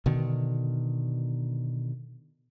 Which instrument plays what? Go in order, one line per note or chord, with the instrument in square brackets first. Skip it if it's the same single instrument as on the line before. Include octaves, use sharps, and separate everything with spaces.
[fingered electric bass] B2 D3 D#3